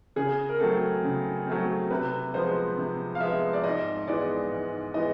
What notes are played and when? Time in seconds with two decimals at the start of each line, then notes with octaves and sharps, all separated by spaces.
0.16 C#3 G#4
0.49 A#4
0.60 F#3 A3 C4 A4
1.03 C#3
1.47 F#3 A3 C4
1.91 C3 B4
2.34 F3 G#3 B3 C5
2.78 C3
3.15 F5
3.20 F3 G#3 B3 E5
3.53 D5
3.64 G#2 D#5
4.07 E3 G#3 B3 D5
4.52 G#2
4.94 E3 G#3 B3 D#5